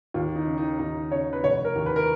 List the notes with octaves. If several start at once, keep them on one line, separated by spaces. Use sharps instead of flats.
D#2 F4
D#4
C#3
D#4
D#2 D#4
C#3 C#5
B4
F1 C#5
A#4
D#2
B4
A#4